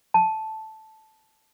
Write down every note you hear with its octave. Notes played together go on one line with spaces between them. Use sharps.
A5